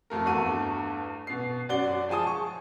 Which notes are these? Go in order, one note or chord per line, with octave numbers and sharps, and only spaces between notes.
F2 A3 A#4
E2 G2 A3 F#4 C#6 D#7
B2 C7
F#2 F#4 D5 G7
F3 G#3 G#5 A5 D#6
C#6